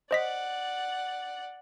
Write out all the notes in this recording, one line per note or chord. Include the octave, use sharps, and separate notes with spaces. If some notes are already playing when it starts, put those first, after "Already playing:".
C5 D5 D#5 F#5 B6